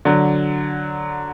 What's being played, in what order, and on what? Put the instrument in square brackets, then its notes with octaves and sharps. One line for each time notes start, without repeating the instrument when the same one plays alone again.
[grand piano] D3 F#3